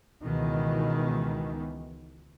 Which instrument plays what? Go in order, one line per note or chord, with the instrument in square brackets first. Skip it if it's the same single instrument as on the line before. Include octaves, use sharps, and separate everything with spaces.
[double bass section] C#2 B2 D#3 E3